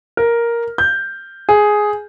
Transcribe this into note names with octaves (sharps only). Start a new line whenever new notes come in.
A#4
G6
G#4